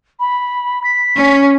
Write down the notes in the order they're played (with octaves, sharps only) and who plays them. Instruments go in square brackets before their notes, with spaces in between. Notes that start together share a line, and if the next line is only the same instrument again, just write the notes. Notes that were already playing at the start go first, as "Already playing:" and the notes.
[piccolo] B5
B6
[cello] C#4